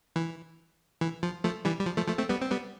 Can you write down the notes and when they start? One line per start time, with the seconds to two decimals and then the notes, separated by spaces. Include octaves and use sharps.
0.16 E3
1.01 E3
1.23 F3
1.44 F3 A3
1.65 E3 G3
1.79 G3
1.86 F3
1.97 F3 A3
2.08 F3 A3
2.18 A3 C4
2.29 G3 B3
2.41 C4
2.51 G3 B3